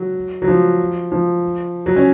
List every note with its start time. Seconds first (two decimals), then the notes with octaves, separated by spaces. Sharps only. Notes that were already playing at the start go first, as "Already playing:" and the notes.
Already playing: F#3
0.42 F#3
0.48 F3
1.12 F3
1.86 F#3
1.96 C#4